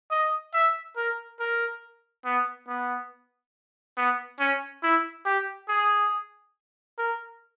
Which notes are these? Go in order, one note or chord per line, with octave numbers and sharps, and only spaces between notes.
D#5
E5
A#4
A#4
B3
B3
B3
C#4
E4
G4
G#4
A#4